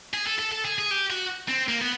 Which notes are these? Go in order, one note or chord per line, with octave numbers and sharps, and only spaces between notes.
G#4
A4
A4
A4
G#4
G#4
G4
F#4
C4
A#3
B3